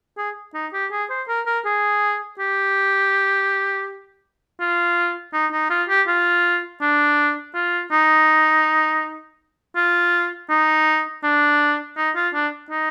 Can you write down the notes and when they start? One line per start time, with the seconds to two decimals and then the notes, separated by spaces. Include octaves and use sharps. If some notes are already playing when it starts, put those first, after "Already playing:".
0.17 G#4
0.54 D#4
0.73 G4
0.91 G#4
1.10 C5
1.28 A#4
1.46 A#4
1.65 G#4
2.39 G4
4.60 F4
5.34 D#4
5.52 D#4
5.71 F4
5.89 G4
6.08 F4
6.81 D4
7.55 F4
7.92 D#4
9.76 F4
10.50 D#4
11.24 D4
11.97 D#4
12.16 F4
12.34 D4
12.71 D#4